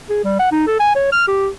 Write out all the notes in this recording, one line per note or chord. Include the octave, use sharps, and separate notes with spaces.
G#4
G3
F#5
D#4
A4
G#5
C#5
F6
G4